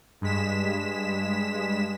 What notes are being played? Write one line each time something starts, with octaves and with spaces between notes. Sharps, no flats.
G2 G#3 B6 E7